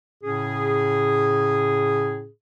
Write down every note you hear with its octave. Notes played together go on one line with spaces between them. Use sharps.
A2 C#3 C#4 G#4